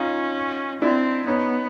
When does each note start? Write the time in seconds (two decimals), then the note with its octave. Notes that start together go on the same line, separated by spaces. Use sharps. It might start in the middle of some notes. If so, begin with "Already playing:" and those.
Already playing: C#4 D#4 F4
0.82 C4 D4 E4
1.26 B3 C#4 D#4